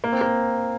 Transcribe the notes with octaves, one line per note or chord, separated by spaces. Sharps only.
A#3
C4
A#3